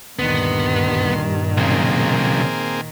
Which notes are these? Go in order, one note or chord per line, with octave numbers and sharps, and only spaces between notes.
D2 G2 A#2 D#3 B3 C6
B1 C#3 A#3 C4 G#4